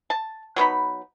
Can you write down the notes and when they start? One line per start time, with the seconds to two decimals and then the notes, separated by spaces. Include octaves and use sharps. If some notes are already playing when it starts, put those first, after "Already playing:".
0.10 A5
0.56 F#3 B3 D#4 B5